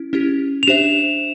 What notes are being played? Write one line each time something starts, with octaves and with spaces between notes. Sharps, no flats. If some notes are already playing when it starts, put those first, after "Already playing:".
Already playing: C#4 E4
C#4 E4 G4
F7
D4 G4 C5 E5 E7